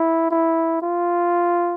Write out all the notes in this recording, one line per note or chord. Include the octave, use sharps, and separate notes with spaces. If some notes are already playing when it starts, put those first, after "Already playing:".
Already playing: E4
E4
F4